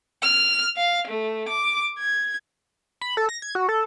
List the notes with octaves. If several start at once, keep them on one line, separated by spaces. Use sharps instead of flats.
F6
F5
A3
D6
G#6
B5
A4
A#6
G#6
F#4
A4